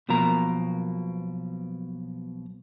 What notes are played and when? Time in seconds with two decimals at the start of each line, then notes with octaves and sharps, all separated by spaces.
0.08 B1 B2 F3 A#3 A#5